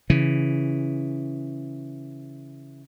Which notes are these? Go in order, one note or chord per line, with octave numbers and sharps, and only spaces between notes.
C#3 E3